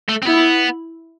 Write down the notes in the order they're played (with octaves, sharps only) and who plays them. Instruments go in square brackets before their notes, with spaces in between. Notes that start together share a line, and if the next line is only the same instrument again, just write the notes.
[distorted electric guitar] A3
C4
[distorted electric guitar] B3 [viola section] E4